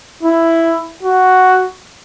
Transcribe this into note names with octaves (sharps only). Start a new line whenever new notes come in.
E4
F#4